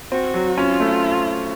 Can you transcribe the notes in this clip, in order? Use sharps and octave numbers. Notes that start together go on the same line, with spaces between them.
C4 F#4
F#3
C#4 F4
A3